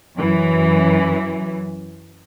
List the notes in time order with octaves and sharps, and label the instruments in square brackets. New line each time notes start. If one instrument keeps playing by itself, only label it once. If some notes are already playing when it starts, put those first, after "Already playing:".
[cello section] F#2 E3